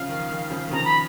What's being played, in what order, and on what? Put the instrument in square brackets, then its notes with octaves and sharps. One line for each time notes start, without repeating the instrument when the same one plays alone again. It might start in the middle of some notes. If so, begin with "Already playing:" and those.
Already playing: [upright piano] C#3 F3 [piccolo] F5
[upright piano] D#3
D#3
C#3 F3
D#3
[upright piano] C#3 F3 [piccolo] A#5
[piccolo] B5